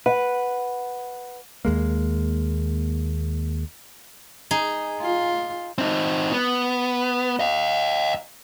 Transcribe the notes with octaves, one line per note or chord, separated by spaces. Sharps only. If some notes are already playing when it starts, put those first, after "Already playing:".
B4 F#5
D#2 G#3 A#3
D#4 G#4
F4
C4 D#4
B3
D#5 F5